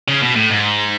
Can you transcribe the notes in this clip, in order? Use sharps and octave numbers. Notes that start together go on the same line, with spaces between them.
C#3
B2
A2
G#2